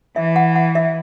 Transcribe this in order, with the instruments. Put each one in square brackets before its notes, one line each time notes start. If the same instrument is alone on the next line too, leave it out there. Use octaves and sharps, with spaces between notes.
[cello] E3 [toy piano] E5
[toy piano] F#5
F#5
E5